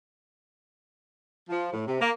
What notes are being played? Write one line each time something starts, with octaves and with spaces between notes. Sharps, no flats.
F3
A2
C3
A#3